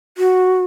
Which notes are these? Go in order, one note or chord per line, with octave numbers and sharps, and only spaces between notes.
F#4